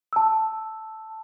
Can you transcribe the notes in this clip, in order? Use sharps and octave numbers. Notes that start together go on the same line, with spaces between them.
A5 E6